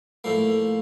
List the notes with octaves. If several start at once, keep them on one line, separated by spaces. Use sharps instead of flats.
A2 F3 A#3